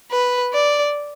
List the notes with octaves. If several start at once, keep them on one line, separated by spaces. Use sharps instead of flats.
B4
D5